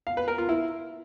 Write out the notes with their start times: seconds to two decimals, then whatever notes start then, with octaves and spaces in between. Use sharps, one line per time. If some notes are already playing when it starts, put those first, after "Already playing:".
0.07 F5
0.17 B4
0.28 A#4
0.38 F4
0.49 E4